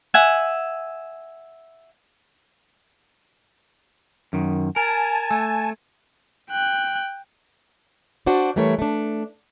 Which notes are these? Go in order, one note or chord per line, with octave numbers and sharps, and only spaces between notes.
E5 F#5 G#5
F#2 D#3
A#4 G#5 A5
A3
G5 F#6
D4 F#4 C5 D5
E3 G3 A3 A#4 C#5
A3 D4